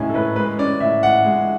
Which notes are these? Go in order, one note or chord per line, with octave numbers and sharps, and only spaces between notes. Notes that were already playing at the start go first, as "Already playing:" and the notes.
Already playing: A2 G#3 C#4 E5 G#5
A4
A2 B4
G#3 B4
C#4 D5
A2 E5
A2 F#5
G#3